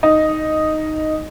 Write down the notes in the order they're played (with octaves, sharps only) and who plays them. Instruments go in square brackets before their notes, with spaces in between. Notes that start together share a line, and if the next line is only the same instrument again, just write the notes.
[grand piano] D#4